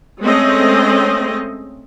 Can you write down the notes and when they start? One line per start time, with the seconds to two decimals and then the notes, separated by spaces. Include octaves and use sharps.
0.21 G#3 A3 C4 C#4 D#5